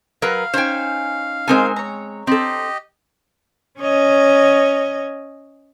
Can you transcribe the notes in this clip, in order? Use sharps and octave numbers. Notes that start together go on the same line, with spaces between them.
F#3 A#4 B4 F5
C#4 D#4 C5 G5 G#5
G#3 C4 D#4 A#4 C5 G#5
C#5 A#5
C4 G4 A4 D#5
C#4 C#5 D#5